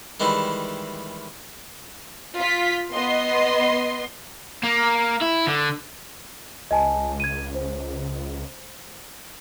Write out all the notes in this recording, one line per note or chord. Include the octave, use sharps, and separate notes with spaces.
D#3 E3 G3 G#3 E4
F4 B6
B3 D#5 C6
A#3
E4
D3
C#2 D#5 G#5 A5
G#6 D#7
C5